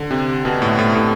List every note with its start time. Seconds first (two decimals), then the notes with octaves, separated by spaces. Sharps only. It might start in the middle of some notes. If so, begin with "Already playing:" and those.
Already playing: D3
0.11 C3
0.45 B2
0.62 A2
0.79 A2
0.95 A2